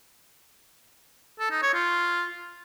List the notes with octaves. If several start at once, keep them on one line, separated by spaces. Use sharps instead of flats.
A4
D#4
C#5
F4